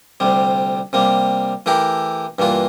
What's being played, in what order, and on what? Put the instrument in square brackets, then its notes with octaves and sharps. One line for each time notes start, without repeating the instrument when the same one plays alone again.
[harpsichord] D2 C3 G3
C3 G3 A#3
E3 A3 E4 G4 A#4
G2 E3 A#3 F4